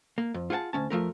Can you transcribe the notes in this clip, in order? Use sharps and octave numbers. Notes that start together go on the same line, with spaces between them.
A#3
F2
F4 G#4 F#5 G#5 A5
D2 C#4 A5
F2 F3 A3 A#4